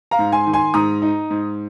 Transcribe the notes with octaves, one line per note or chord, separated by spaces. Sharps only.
F5 A#5
G#2
G#5 C6
D#3
G#5 C6
G#2 A#5 D#6
D#4
G#2